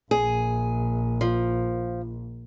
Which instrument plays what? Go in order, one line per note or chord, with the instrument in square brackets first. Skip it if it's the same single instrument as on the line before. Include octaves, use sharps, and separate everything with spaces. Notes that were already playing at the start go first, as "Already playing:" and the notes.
[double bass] A#1 [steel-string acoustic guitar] G#4
[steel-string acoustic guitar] F3